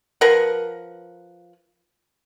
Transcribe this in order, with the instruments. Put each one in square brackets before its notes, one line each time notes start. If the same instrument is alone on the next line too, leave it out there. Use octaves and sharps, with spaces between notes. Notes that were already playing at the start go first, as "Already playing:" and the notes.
[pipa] F3 A#4 B4 F#5